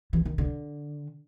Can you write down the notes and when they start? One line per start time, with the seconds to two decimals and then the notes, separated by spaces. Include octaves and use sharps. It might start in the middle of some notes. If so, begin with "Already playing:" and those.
0.13 E3
0.25 D#3
0.38 D3